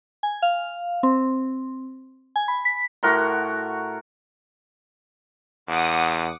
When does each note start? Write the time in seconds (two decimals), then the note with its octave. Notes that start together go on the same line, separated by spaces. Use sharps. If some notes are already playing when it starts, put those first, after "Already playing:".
0.23 G#5
0.42 F5
1.03 C4
2.36 G#5
2.48 B5
2.65 B6
3.03 A2 F#4 A#4 C6
5.68 E2 F#5 D6 D#6